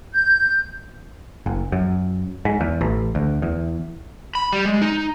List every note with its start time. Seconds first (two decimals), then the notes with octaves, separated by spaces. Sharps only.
0.13 G6
1.46 F#1
1.72 F#2
2.45 G#2
2.61 E2
2.81 A1
3.15 D2
3.42 E2
4.35 B5
4.53 G3
4.65 G#3
4.82 D#4